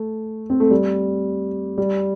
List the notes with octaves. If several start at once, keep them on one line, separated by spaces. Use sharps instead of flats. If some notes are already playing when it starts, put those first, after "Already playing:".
Already playing: A3
C4
A3
G3
G3